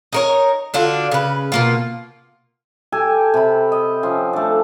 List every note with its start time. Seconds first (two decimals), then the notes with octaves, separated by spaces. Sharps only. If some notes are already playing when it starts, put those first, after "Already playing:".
0.13 D#4 A#4 C#5
0.74 D3 D4 F4 F#4
1.11 C#3 B4
1.52 B2 A#3 F4
2.92 G4 A4 G#5
3.34 C3 B5
3.72 D#5
4.03 F3 C4 C#4
4.33 A3 D4